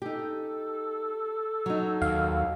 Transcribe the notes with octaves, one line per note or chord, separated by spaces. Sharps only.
D#4 G4 A4
F#3 D#4
D#2 F5